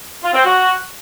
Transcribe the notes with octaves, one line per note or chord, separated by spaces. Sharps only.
F4
C4
F#4